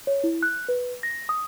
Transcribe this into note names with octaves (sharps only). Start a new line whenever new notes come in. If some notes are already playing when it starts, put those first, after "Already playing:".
C#5
E4
F#6
B4
A#6
D#6